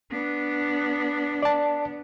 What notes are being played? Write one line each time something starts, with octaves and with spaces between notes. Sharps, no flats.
B3 D4
D5 A5